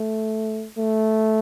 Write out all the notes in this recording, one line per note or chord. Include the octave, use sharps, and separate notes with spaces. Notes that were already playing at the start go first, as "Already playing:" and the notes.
Already playing: A3
A3